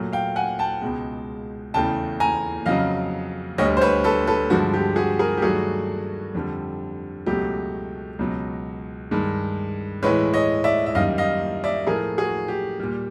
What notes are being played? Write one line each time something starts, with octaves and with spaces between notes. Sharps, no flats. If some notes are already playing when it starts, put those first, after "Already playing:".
Already playing: A#2 F#3 A3
F5 G5
F#5 G#5
G5 A5
C#2 B2 G#3
E2 C#3 E3 A3 G5 A5
G#5 A#5
F2 C#3 F#3 D#5 F5
D2 D3 G3 C#5 D#5
C5
B4 C#5
A4 B4
A4 B4
G2 D3 F3 G#3 F#4
G4
F#4 G#4
G#4 A#4
G4
G2 D#3 F#3 A3 F#4 G#4
F2 D3 G3
C#2 B2 F#3 A3 G4
C#2 B2 F#3
G2 D#3 G#3
A2 E3 G#3 B4 C#5
C#5 D#5
D5 E5
E5
F#2 D#3 G3 D#5 F5
D#5 F5
D5 E5
A2 F3 A3 G#4 A#4
F#4 G#4
G4
A#2 G3